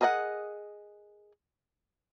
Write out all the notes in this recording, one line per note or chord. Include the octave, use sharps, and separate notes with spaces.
G#4 A#4 D#5 F5 F#5